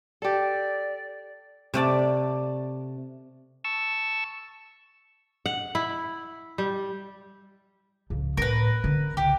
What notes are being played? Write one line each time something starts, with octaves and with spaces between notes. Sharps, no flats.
G4 A4 D5
C3 A3 D5 A5
A5 C#6 E6
F#5
E4
G3
C#2 F3
A2 A#4 B4
D3
C#2 G4